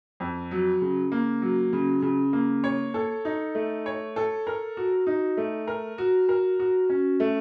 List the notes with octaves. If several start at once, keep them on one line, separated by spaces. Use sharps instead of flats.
F2
F#3
C#3
A#3
F#3
C#3
C#3
A#3
C#5
A4
D#4
A3
C#5
A4
A#4
F#4
D#4
A3
A#4
F#4
A#4
F#4
C#4
A3